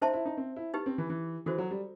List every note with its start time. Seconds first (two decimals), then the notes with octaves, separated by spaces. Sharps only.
0.01 D#4 C5 E5 A5 C6
0.13 E4
0.25 D#4
0.37 C4
0.56 E4
0.74 D#4 G4 B4
0.86 C4
0.98 E3
1.10 E3
1.46 E3 F#4 A4 C5
1.58 F#3
1.71 G3